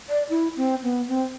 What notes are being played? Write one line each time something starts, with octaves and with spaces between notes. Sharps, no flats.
D5
E4
C4
B3
C4